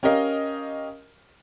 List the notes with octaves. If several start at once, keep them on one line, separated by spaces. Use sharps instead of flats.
C#4 G4 A#4 D#5 F5